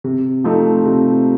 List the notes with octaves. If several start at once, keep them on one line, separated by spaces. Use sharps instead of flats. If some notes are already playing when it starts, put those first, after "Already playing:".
C3
F3 A3 C4 D#4
C3